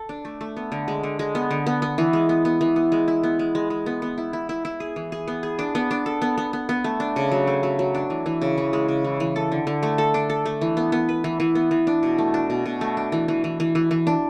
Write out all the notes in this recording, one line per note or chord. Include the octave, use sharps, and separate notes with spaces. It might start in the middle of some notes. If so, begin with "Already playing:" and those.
Already playing: A4
D4
A3
A3
B3
D3
G#3
D3
G#3
B3
D3
B3
B3
E3
G#3
B3
B3
E3
B3
G#3
E4
B3
G#3
G#3
G#3
B3
B3
E4
E4
E4
E4
G#4
E3
G#4
B3
G#4
D4
B3
D4
A4
B3
B3
B3
B3
A3
D4
C#3
F#3
A3
F#3
F#3
D4
E3
E3
C#3
E3
G#3
C#3
E3
E3
A4
D3
D3
A3
A4
D4
A4
A3
E3
B3
B3
B4
E3
E3
B3
E3
D4
B2
A3
D4
B2
B2
A3
D4
E3
E3
E3
E3
E3
E3
D4